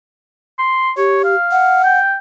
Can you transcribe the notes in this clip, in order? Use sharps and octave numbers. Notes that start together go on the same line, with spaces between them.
C6
G4 C#5
F5
F#5
G5